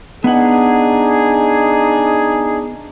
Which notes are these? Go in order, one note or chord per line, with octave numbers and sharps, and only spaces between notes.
B3 D4 D#4 G#4 F#5